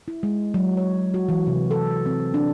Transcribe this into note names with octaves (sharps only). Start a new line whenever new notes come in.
E4
G#3
F#3
C#5
F#4
E3
C3
A4
C4
D4